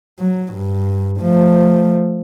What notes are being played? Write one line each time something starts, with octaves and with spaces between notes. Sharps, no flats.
F#3
G2
F3 A3